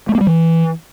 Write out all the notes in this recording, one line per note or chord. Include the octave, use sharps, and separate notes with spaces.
A3
A#3
G3
E3